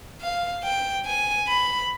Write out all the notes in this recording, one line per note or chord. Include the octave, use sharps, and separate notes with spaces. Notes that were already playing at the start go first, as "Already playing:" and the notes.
F5
G5
G#5
B5